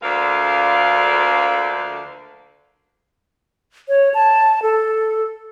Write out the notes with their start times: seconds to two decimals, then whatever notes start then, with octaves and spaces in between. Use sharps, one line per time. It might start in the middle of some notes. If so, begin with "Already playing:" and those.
0.03 D2 D3 F3 A#3 D5 F5
3.88 C#5
4.14 A5
4.63 A4